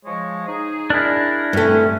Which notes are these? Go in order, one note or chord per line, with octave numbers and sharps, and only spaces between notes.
F3 G#3 C#5
D#4 G#4
D4 E4 G#4 A#4
G2 A3 C4 C#4